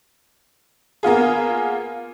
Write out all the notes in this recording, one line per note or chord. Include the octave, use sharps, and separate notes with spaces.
A#3 B3 F4 G#4